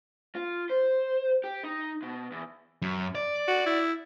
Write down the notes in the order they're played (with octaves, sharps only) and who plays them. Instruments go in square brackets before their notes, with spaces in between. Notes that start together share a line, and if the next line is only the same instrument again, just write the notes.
[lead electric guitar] F4
C5
G4
D#4
B2
E2
[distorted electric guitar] F#2
D5
[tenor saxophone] F#4
E4